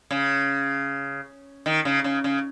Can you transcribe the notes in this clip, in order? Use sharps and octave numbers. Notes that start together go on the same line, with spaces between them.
C#3
D#3
C#3
C#3
C#3